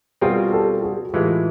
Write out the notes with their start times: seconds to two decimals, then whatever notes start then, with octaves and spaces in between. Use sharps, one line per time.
0.21 B2 G3 C4 F4 F#4 G#4 A#4
0.53 G4 A4
0.83 F#4 G#4
1.14 A2 E3 G#3 F4 G4